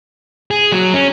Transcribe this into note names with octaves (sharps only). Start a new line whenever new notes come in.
G#4
F#3
C#4